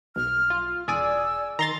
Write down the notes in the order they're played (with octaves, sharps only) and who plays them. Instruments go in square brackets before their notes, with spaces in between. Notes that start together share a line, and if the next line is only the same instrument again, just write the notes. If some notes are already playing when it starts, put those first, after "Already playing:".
[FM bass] B1 [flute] F6
[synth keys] F4
[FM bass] E1 [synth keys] G#4 D5 G#5 [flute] E6
[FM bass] D#3 [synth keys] A#5 C6 A6